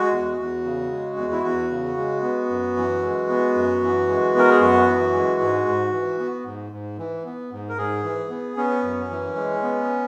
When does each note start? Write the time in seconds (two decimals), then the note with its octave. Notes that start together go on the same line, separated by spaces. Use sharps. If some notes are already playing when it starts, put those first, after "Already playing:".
Already playing: G#3 F#4
0.12 E2
0.39 E2
0.64 C#3
0.90 G#3
1.17 E2
1.32 E4
1.43 E2 F#4
1.70 C#3
1.97 G#3
2.22 B3
2.50 F#2
2.76 E3
3.02 G#3
3.29 B3
3.55 F#2
3.82 E3
4.08 G#3
4.34 B3 A#4
4.50 G#4
4.60 F#2 F#4
4.87 E3
5.13 G#3
5.40 G#2
5.66 G#2
5.92 E3
6.19 B3
6.45 G#2
6.72 G#2
6.98 E3
7.25 B3
7.52 G#2
7.69 A#4
7.77 G#2 G#4
8.04 E3
8.30 B3
8.57 B3 C#4
8.83 F#2
9.10 E3
9.36 G#3
9.62 B3